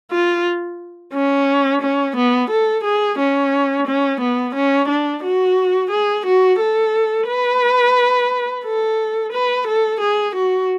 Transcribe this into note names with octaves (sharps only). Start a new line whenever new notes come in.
F4
C#4
C#4
B3
A4
G#4
C#4
C#4
B3
C#4
D4
F#4
G#4
F#4
A4
B4
A4
B4
A4
G#4
F#4